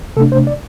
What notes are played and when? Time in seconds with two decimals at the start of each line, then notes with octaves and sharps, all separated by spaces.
0.16 C3 A3 D4 A4
0.32 C5
0.47 D5